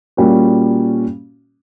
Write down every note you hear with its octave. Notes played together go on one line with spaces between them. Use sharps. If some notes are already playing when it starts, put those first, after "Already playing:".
A#2 G3 A#3 C#4 F#4